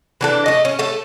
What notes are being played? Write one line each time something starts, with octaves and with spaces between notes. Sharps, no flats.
E3 D4 A4
A3 D#5
C#4
A3 A4